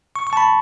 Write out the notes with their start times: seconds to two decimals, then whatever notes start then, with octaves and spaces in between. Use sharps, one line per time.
0.16 C#6
0.27 C#6
0.33 A5
0.37 B5